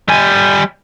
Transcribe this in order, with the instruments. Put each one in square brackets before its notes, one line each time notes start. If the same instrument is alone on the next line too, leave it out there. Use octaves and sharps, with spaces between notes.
[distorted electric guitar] G3 G#5